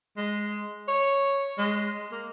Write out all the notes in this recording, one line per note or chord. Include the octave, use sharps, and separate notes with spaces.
G#3
C#5
G#3
A#3